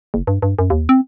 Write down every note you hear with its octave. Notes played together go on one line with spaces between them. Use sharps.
F#1
G2
G2
F#2
D#2
C4